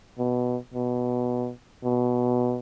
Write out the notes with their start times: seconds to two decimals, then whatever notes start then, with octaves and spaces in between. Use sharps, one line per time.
0.18 B2
0.74 B2
1.84 B2